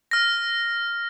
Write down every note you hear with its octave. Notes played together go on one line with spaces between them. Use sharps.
F6 A#6